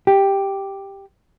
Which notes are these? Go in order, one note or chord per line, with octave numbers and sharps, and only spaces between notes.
G4